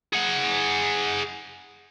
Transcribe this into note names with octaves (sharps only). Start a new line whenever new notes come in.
G#4 F#5